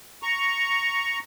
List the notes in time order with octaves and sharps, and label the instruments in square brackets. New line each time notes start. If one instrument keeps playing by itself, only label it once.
[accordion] A#5 C#6